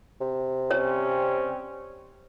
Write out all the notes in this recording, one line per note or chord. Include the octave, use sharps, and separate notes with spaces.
C3
G3 C4 C#4 C#5